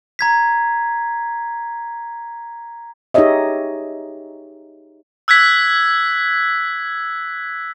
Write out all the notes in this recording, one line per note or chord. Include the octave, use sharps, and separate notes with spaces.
A#5 G#6 B6
D#4 G4 G#4 C#5 D#5 E5
E6 F#6 G#6 B6